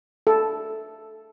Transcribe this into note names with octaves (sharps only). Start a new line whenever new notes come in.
A4